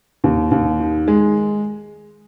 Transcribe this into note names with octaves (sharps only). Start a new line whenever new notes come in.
D#2
D#2
D#3
G#3